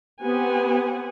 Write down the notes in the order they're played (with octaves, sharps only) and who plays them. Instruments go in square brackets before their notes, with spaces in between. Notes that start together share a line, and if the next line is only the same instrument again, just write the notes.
[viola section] B3 C4 G4 F#5 G#5